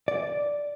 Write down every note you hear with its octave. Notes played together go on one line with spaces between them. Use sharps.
D5